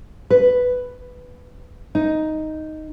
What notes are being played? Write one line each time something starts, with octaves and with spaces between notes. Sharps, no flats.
B4
D#4